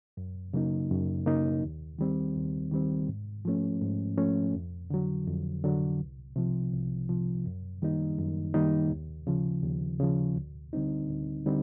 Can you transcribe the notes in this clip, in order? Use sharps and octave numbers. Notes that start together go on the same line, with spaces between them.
F#2
C#3 F#3 A#3 D#4
F#2
C#3 F#3 A#3 D#4
D#2
D#3 G3 C4
D#2
D#3 G3 C4
G#2
F3 A3 C#4
G#2
F3 A3 C#4
F2
D3 F#3
F2
D3 F#3
C2
C3 F3
C2
C3 F3
F#2
D#3 G3 A#3 D#4
F#2
D#3 G3 A#3 D#4
D#2
C#3 F3
D#2
C#3 F3
D2
D3 G3 C4 D#4
D2
D3 G3 C4 D#4